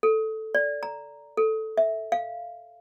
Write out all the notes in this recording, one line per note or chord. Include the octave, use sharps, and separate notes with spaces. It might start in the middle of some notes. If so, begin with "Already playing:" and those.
A4
D5
A#5
A4
E5
F5